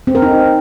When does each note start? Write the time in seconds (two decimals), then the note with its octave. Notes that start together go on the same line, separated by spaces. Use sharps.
0.07 C4
0.15 A#4
0.22 D#4